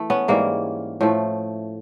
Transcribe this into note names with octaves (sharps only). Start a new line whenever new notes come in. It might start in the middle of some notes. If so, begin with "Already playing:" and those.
Already playing: E3 A3
B3 C#4
G#2 E3 G3 A#3
A2 F3 A3